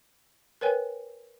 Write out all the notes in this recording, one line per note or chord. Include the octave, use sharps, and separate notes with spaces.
A#4 B4 C#5 G5 G#5